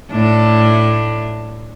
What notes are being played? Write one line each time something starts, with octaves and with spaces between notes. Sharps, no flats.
A2 D4